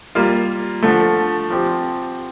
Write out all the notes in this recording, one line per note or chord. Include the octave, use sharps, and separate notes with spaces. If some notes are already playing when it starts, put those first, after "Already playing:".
G3 A#3 F4
D3 F3 A3
F3 C4 G4